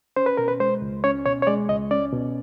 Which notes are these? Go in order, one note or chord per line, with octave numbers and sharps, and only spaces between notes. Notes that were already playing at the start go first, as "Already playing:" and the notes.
C#4 C5
B4
B2 A#4
B4
G#3 C5
C#2
C#4 C#5
B2 C#5
C#5
G#3 D5
C#2 D#5
C#4 D5
B2